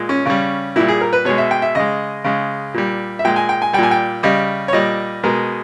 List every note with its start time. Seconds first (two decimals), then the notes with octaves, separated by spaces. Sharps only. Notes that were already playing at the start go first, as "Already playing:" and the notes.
Already playing: A#2 G#3
0.09 C#4
0.25 C#3 G3 C#4
0.76 A#2 G3 E4
0.88 G#4
1.01 A#4
1.13 B4
1.25 B2 G#3 C#5
1.38 E5
1.51 G5
1.62 E5
1.75 C#3 G#3 D#5
2.24 C#3 G#3
2.74 A#2 G3
3.19 E5
3.24 A#2 G#3 G5
3.36 G#5
3.49 G5
3.62 G#5
3.73 G3 G5
3.78 A#2 G#5
3.91 G5
4.23 C#3 G3 D#5
4.68 C#5
4.73 A#2 G3 D#5
5.23 B2 G#3 A#4